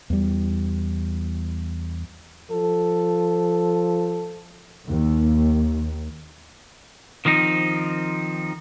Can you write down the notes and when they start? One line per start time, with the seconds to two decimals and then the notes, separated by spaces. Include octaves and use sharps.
0.10 E2 G3
2.51 F3 A4
4.87 D#2
7.25 D#3 F3 C4 D#4